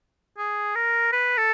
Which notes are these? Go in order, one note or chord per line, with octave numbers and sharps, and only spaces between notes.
G#4
A#4
B4
A4